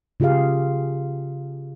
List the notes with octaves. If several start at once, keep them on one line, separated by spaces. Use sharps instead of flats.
C#3 F4 G4 G#4 F5